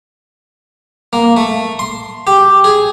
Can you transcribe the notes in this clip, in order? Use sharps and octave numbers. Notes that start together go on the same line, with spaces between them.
A#3
A3
C6
G4
G#4